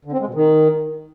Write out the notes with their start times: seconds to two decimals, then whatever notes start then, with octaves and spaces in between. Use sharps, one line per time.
0.05 D3
0.12 C4
0.19 G#3
0.27 B2
0.34 D#3